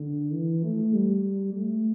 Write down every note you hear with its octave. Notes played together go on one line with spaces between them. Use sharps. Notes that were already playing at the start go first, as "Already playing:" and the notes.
Already playing: D3
E3
A3
G3
A3